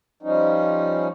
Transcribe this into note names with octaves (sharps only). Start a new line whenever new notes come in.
F3 G3 C#4 D#4